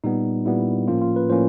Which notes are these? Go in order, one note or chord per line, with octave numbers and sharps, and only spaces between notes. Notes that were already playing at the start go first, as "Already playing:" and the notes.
A#2 G3 B3 D#4
A#2 G3 B3 E4
A2 F3 A#3 C#4 F4
F4
B4
A2 F3 A#3 C#4 C5